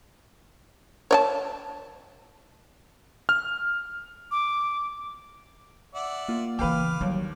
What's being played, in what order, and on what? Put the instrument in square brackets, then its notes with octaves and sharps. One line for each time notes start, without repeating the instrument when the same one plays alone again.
[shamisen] C#5 D5 A5
[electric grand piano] F6
[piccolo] D6
[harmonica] D5 E5 F#5
[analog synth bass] A#3 [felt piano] F4
[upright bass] C#3 E3 [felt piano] B4 F5 G5 [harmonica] D6 F6
[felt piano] D#2 [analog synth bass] F#3 [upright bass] G3